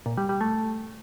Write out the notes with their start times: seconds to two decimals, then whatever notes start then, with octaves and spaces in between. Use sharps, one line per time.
0.06 A#2
0.17 G3
0.29 G3
0.41 A3